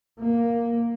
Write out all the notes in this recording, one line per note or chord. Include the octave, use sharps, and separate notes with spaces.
A#3